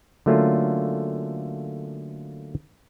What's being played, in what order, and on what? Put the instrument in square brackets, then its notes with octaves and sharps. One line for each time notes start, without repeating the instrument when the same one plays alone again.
[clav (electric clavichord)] D3 F#3 A3 A#3 C#4 F4